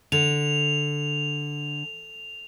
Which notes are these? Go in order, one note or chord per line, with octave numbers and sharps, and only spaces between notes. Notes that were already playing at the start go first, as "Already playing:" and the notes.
D3 F7